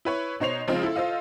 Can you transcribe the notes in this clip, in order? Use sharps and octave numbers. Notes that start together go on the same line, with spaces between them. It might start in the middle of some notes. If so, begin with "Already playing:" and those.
E4 B4 C#5
B2 D#4 C5 C#5 C7 F7
C#3 F3 G#3 C4 D#4 F4
E4 A4
F4 A4 C5 D#5 F5